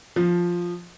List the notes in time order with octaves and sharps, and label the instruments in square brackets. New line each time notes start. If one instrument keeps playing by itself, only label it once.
[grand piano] F3